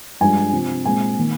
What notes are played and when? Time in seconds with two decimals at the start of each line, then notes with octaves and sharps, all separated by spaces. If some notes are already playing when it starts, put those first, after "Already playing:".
0.21 G2 F3 G#3 D4 G#5
0.53 C3 F3 C4
0.85 A#2 G#3 C4 G#5
1.18 D#3 A#3